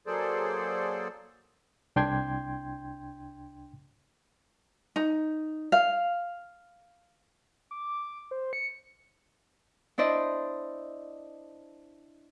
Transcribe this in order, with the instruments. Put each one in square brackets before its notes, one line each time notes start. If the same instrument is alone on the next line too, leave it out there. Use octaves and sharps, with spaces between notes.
[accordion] F#3 A#3 G#4 A4 C5 D5
[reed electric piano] C2 D4 G5 C6 G6 G#6
[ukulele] D#4
F5
[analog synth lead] D6
C5
C#7
[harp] D4 E4 C5 D5 D#5